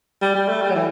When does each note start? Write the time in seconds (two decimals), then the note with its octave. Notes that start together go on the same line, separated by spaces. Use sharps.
0.22 G3
0.35 G3
0.49 A3
0.62 G3
0.70 F#3
0.75 E3